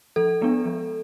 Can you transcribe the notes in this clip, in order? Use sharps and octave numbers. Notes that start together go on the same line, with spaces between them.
F3 A4
G#3 B3 D4
F3